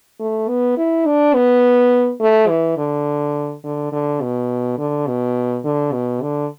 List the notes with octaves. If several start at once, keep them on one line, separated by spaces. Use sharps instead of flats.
A3
B3
E4
D4
B3
A3
E3
D3
D3
D3
B2
D3
B2
D3
B2
D3